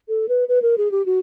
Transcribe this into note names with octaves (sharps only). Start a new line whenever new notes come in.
A4
B4
B4
A#4
G#4
G4
F#4